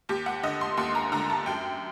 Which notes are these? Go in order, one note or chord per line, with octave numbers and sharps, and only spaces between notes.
D#2 G4
F#5
D3 D#5
C6
D#2 C6
A#5
D3 A#5
A5
F#2 G5